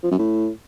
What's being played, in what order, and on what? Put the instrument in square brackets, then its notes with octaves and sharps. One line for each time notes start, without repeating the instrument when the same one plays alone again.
[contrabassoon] F3
F#2
A2